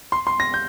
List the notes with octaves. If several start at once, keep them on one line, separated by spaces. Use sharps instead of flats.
C6
C6
A#6
G6